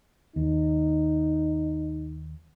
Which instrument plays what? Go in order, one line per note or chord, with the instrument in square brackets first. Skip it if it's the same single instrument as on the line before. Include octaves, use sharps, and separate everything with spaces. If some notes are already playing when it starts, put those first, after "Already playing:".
[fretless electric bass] D#2 [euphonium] D#4